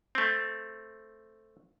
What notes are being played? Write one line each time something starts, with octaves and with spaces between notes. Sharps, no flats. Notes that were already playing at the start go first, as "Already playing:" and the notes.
A3 C4